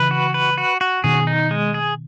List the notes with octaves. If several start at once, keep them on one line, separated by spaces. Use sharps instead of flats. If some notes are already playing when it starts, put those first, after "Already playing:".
Already playing: C#3 E3 B4
F#4
B4
F#4
F#4
B2 D#3 G#4
D#4
G#3
G#4